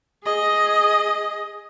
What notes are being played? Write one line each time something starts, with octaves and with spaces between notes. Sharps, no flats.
G#4 D#5